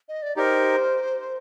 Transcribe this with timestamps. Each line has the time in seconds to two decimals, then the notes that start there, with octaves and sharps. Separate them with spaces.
0.09 D#5
0.22 D5
0.36 D#4 G4 A#4 C5 D5